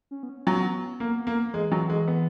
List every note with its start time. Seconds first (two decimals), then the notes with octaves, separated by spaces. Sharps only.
0.11 C#4
0.23 B3
0.29 C#4
0.47 F#3 B3
1.00 A#3
1.27 A#3
1.53 E3 G#3
1.72 F#3
1.90 G#3
2.08 B3